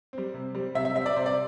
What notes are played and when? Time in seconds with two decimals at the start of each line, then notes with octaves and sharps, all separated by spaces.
0.13 G3 C4
0.34 C3
0.55 G3 C4
0.75 C3 E5
0.85 E5
0.95 G3 C4 E5
1.06 D5
1.16 C3 C5
1.26 D5